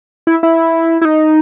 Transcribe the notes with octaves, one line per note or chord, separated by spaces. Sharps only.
E4
E4
E4
D#4